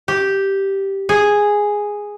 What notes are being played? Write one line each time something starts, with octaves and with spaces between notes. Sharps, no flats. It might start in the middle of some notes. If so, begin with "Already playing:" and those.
G4
G#4